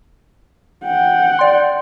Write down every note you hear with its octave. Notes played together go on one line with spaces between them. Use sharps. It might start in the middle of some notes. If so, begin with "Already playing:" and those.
F#5 G5
D5 C6